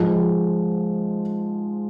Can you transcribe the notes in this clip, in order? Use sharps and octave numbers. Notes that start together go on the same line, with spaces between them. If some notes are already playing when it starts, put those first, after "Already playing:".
Already playing: G#2 F3 G#3